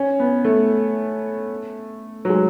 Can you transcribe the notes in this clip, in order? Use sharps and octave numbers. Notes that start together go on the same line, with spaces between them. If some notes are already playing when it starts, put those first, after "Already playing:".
Already playing: C#4
B3
A3
F#3
G#3